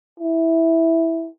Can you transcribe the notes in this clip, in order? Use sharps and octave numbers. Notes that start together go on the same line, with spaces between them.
E4